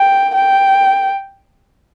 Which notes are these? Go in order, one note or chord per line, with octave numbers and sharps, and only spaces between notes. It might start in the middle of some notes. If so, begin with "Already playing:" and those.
Already playing: G5
G5